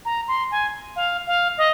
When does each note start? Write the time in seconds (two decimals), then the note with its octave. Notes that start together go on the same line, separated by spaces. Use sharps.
0.05 A#5
0.28 C6
0.51 G#5
0.96 F5
1.27 F5
1.58 D#5